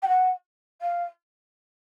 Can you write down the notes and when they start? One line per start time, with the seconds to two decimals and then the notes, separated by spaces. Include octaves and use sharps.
0.03 G5
0.08 F#5
0.82 F5